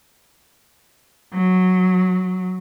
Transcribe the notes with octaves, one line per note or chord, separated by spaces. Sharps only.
F#3